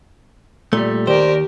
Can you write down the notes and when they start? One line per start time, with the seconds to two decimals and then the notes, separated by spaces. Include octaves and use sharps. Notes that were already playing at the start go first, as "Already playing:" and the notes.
0.73 A#2 G3 A3
1.07 D#2 G4 A#4 C5 D5